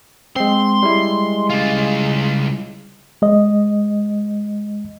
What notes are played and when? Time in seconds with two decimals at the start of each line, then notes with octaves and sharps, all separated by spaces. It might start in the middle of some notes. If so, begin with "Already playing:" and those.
0.36 G#3 C4 C6
0.83 G3 G#3 E4
1.50 C#3 F4
3.22 G#3 D#5